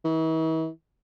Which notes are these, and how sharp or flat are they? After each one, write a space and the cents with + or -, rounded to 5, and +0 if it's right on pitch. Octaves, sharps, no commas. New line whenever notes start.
E3 -45